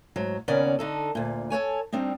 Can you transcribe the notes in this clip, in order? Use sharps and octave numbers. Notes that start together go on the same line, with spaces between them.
G#2 F#3
D#2 C#3 B3 C#4 A#4 D5
D3 D#4 A4
D2 A#2
A4 B4 C#5 G#5
G3 C4 D4 D#4